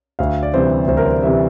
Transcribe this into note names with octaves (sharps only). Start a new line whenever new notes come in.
D2 F5
D5
C3 E3 G3 C5
D2 C5
A#4
C5
C3 E3 G3 E5